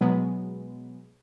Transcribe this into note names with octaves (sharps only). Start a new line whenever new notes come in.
B2 F#3 G#3 B3